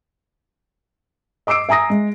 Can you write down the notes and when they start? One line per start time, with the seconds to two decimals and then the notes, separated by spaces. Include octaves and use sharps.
1.47 D#5 D6 E6 C7 D7
1.69 E5 G#5 A#5 D#6 A#6
1.90 G#3